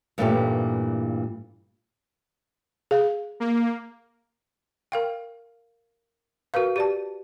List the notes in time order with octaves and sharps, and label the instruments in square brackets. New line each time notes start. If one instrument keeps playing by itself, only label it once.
[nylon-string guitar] G2 A#2 E3 A3 C#4 G4
[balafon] G#4 F5
[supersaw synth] A#3
[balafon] A#4 F5 G5
F#4 A#4 B4 F5
G4 D5 A5